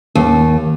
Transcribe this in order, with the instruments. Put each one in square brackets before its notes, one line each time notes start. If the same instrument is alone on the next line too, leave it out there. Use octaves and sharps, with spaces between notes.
[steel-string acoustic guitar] D#2